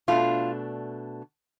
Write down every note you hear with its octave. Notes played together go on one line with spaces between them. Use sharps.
B2 A3 D4 F4